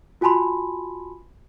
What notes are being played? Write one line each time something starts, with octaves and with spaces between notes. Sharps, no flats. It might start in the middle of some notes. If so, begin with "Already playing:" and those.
F4 F#4 G#5 A5 B5 C6